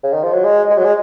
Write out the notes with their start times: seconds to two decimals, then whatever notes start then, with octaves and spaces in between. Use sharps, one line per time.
0.03 C#3
0.13 D#3
0.23 F3
0.33 F#3
0.44 G#3
0.70 G#3
0.77 F#3
0.84 G#3